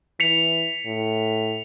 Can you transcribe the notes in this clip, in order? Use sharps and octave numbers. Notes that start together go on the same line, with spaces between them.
E3 B6 C#7 F7
A2